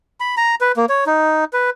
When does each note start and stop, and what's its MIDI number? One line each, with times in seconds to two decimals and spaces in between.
0.20 0.35 83
0.37 0.55 82
0.61 0.72 71
0.77 0.86 58
0.89 1.04 73
1.06 1.45 63
1.53 1.70 71